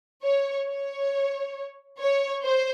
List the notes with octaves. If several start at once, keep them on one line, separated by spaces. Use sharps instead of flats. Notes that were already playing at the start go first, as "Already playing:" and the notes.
C#5
C#5
C#5
C5